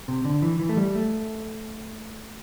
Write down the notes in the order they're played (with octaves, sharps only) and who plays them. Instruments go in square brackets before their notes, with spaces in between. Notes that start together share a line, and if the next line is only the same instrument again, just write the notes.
[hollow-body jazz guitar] C3
D3
E3
E3
A3
G3
A3